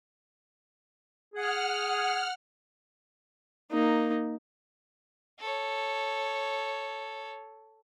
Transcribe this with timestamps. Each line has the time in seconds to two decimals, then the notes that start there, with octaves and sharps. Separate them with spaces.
1.34 G#4 F#5 F6
3.71 A#3 D#4
5.39 A4 C#5